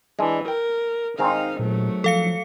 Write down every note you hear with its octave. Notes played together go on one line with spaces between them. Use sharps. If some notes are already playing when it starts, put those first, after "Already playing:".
E3 G#3 D4
A#4 G5
D#3 G#3 C4 D#4 F5
A#2 F#3 A3
F3 A4 F5 C#7